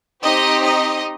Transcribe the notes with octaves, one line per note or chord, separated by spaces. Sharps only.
C4 D#4 G4 D#5
D#5